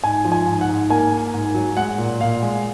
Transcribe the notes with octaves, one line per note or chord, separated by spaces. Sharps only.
G#2 G#5
F3
G#5
G#2
F#5
G#2
A#3 G#5
A#3
G#2
F#3
G#3 F#5
A#2
A#2 F5
G#3